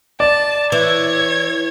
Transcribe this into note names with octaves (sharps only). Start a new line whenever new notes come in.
D5 A5
E3 C#5 G#6